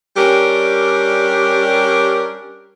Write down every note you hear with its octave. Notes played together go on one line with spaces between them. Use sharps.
G3 C#4 D4 G4 A#4